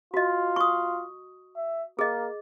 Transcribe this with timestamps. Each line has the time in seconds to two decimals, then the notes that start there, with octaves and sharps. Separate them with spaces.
0.14 F4 F#4 D#5
0.56 C#6 D#6
1.57 E5
1.99 A#3 G#4 D#5